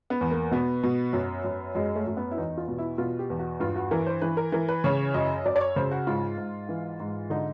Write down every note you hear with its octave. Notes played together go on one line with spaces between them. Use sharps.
B3
E2
A#3
B2 B3
B2
F#2
F#2
F#2 G#3
A3
F#2
B3
E4
E2 D#4
F4
B2
E4
B2 F4
G4
E2
F#4
G2 F4
F#4
E3 A#4
C5
E3 B4
A#4
E3 A#4
B4
C#3 C#5
F#2 D#5
F#2 D5
D5
C#5
C#3 C5
F#4
G#2 F4
G#2
E3
G#2
D3 D#4